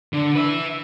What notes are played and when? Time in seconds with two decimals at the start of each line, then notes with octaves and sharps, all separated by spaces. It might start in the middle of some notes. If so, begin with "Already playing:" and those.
0.13 D3
0.35 B4 E5